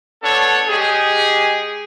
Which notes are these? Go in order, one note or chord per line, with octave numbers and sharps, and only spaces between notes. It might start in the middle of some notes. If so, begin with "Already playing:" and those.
B3 D4 A4 C#5
G#3 G4 G#4